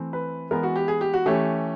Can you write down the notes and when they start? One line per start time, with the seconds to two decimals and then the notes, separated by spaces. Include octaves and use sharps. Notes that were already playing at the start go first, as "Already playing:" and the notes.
Already playing: E3 A3 C4
0.13 B4
0.51 E3 G#3 B3 A#4
0.63 F#4
0.76 G4
0.88 G#4
1.01 G4
1.13 F#4
1.26 E3 A3 C#4 G4